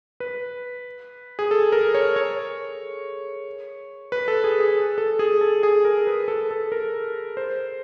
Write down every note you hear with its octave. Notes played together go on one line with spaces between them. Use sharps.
B4
G#4
A4
A#4
C#5
C#5
B4
A4
G#4
G#4
A4
G#4
A4
G#4
A#4
B4
A4
A4
A#4
C5